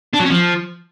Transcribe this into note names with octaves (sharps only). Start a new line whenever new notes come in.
D4
F#3
C#4
F3